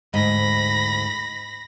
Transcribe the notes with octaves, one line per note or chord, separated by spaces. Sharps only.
D2 G#2 D#5 B5 A#6